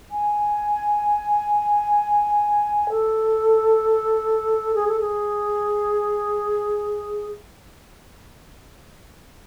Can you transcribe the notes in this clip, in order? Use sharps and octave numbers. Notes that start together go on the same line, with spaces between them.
G#5
A4
G#4
A4
G#4